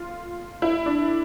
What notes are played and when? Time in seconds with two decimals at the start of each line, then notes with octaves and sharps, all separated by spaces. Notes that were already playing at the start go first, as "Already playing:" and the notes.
Already playing: F4
0.62 E4
0.86 D4